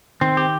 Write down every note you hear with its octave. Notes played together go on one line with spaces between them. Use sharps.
D#3 C4
G4